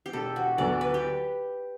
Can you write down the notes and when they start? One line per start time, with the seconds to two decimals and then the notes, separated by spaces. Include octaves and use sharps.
0.06 G4
0.13 E1 A4
0.36 F#4
0.57 D2 D3 F#3 B3 D5
0.81 B4
0.94 G4